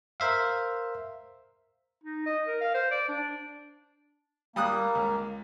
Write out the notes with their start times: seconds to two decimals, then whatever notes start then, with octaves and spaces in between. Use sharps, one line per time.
0.20 A#4 C5 E5 F5
2.04 D#4
2.26 D#5
2.47 A#4
2.61 F5
2.74 C5
2.91 D5
3.09 D4
4.56 G3 A#3 D#6 F#6
4.95 C#2